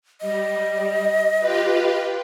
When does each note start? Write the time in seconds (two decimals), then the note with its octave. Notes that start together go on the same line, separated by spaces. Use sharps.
0.21 G3 D#5
1.39 F4 G4 B4